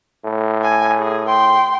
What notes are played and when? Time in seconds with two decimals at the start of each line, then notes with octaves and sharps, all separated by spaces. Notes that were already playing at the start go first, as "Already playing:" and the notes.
0.25 A2
0.63 G#5
0.99 G#4
1.28 G5 C6